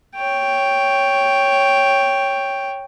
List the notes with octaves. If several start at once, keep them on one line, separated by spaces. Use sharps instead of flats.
C#5 G5